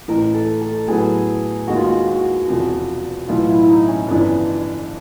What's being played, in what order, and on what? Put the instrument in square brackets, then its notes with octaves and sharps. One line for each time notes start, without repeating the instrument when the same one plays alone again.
[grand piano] A1 A2 E3 [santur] A#4
[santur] A4
A4
[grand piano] A2 F#3 B3 [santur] G#4
[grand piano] D#2 D#3 G#3 B3 [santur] F#4
[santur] F4
F#4
F#4
[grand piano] E1 E2 C3 F3
[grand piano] B1 A2 E3 [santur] F4
[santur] E4
E4
D#4
C#4
[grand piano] G1 F2 C#3 E3 [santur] D4